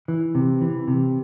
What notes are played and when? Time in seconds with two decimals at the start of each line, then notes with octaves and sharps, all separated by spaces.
0.08 E3
0.35 C3
0.61 E3
0.88 C3